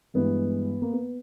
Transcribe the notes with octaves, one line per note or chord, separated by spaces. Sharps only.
G2 E3 G#3 B3
A#3
B3